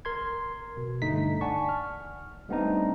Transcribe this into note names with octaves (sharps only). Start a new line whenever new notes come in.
A#4 C6 G#6
B2
G2 D3 A3 D#4 B6
D5 F#5 G#5 A5 C#6
F6
G3 A3 B3 C4 D4 D#4